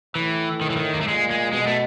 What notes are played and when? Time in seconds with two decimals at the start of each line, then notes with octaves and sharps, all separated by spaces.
0.16 A2 E3
0.61 D#3
0.70 E3
0.77 D#3
0.94 A#3
1.01 A3
1.07 A#2 G#3
1.31 G#3
1.53 B2 G#3
1.67 A3